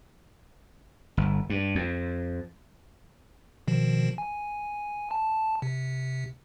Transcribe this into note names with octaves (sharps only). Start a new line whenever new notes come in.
G1
G2
F2
B2 D#3 F3
G#5
A5
C3